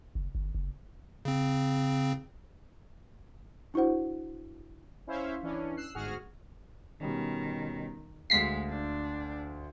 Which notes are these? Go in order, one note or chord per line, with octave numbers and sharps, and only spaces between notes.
F#1
G1
F#1
C#3 C4
D4 E4 F#4 C5 F#5
C#4 E4 C5 C#5 E5 F5
E3 C#4 D4
E6 F#6 C7
G1 G#2 F#4 G#4 F6
B2 D#3 G3 C#4
D2 G#3 F5 B6 C7
D4